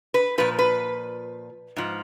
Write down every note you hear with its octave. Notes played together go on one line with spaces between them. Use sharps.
B4
A#2 F3 B4
B4
G#2 F3